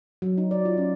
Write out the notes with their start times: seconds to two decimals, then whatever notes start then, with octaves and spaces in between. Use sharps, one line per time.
0.22 F#3
0.38 D#4
0.51 D5
0.65 F4
0.78 C#4